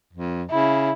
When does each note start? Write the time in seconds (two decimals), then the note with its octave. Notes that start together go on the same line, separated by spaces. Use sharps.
0.13 F2
0.51 C#3 E4